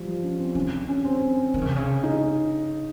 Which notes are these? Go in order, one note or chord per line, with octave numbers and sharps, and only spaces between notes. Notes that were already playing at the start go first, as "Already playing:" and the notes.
Already playing: F3 G3
C#4
C4
D#3 C#4
C#4
C4
D#3
C#3
C3
C#3
D#4